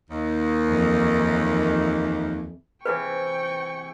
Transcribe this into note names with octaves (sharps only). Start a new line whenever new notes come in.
D#2
F2 E3
C3 E3 E4 B4 G5 C#6